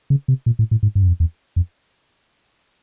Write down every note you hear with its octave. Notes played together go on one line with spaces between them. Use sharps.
C#3
C3
A#2
A2
A2
G#2
G2
F#2
F2
E2
F2